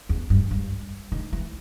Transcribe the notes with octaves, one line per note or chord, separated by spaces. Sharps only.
E2
G2
G2
D#3
E3